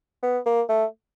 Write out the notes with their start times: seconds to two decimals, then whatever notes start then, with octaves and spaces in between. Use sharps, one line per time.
0.23 B3
0.46 A#3
0.69 A3